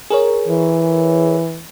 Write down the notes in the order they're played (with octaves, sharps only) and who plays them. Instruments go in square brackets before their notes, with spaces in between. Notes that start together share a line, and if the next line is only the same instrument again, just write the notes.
[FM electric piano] G#4 A#4 C#5
[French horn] E3